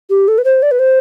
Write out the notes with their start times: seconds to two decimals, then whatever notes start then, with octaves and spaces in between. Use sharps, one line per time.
0.10 G4
0.28 A4
0.38 B4
0.45 C5
0.62 D5
0.71 B4
0.79 C5